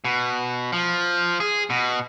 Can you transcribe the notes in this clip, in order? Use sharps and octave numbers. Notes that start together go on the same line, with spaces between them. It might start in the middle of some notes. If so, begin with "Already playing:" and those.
B2
F3
G#4
B2